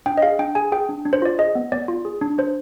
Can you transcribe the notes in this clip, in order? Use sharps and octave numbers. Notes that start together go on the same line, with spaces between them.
D4 G5
D#5
G#4 F5
D4 G5
G#4 G#5
G#4 G5
D4
D4
C5
F4 D5
G#4 D#5
B3
B3 D5
F4
G#4
D4
D4 C5